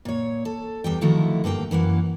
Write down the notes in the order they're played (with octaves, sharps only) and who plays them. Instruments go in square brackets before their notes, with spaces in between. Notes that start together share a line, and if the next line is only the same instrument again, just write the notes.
[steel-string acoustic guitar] A#2 C#5
A4
E2 G3 G5
D3 D#3 F3 A3 E4 F#4
G2 D3 A#3 G5
F#2 E3 A#3 F#5